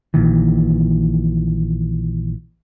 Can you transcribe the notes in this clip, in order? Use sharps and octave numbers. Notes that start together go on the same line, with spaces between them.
A#1 A#2 D#3 E3